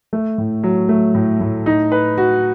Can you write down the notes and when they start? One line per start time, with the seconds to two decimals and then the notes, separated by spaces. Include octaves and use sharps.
0.13 A3
0.38 A2
0.63 F#3
0.89 A3
1.15 A2
1.41 A2
1.66 D#4
1.92 B4
2.18 F#4